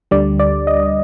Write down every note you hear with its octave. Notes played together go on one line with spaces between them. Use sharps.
D2 D3 G3 D5
D5
D#5